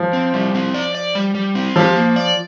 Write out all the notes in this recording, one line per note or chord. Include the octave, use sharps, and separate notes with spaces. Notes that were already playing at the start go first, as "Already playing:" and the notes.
Already playing: F3
C4
G3
C4
D5
D5
G3
G3
C4
F3 G4
A#3
D5